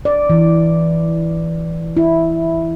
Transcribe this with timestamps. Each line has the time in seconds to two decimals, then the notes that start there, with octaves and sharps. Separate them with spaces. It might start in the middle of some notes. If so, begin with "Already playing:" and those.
0.05 D5
0.30 E3
1.97 E4